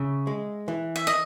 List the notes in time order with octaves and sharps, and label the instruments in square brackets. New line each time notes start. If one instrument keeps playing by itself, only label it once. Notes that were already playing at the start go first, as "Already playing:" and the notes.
Already playing: [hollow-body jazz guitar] C#3 [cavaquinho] E5
[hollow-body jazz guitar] G#3
E3
[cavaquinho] E5
D#5